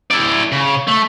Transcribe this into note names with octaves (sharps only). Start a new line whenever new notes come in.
E4 D5
C#3
A3